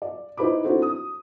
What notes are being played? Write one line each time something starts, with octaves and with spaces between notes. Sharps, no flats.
D5
D#4 E4 B4 C5 B5 D6
C4 D4 E4 F#4 A4 C5
D#6